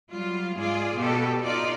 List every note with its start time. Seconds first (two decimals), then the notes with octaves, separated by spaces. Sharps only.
0.12 F#3 G3 F4
0.58 G#2 F4 G#4 D5
0.99 B2 G4 A4
1.43 D#4 F4 D5